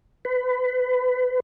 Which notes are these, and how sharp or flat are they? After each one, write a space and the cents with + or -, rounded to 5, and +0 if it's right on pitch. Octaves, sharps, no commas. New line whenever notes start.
B4 +30